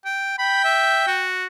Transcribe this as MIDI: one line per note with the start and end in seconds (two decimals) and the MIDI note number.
0.05 0.36 79
0.38 1.23 79
0.38 0.61 83
0.65 1.05 76
1.07 1.46 66